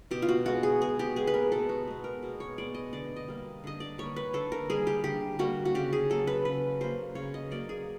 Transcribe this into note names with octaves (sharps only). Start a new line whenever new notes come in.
B2 G4
F4
F#4
G#3 B3 F#4
G#4
B2 G#4
G4
G#3 B3 G#4
B4
A#4
B2 A4
F#4
G#3 B3
A#4
B2
C#5
G#3 B3 D5
D#5
D3 D5
D#5
G3 A#3
D3 D#5
D5
G3 A#3 C#5
B4
D3 A4
A#4
G3 A#3 G#4
G4
D3 G4
G3 A#3 F#4
F#4
C#3 G4
G#4
F#3 A#3 A4
B4
C#3 B4
F#3 A#3 C5
C#3 C#5
D#5
F#3 A#3 D5
G#4